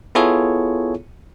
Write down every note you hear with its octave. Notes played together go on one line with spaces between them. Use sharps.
B3 E4 F4 G#4 A4 C#5